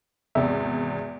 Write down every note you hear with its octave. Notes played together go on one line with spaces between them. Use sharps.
G#1 E2 C3 E5